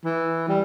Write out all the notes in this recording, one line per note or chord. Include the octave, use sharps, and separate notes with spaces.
E3
G3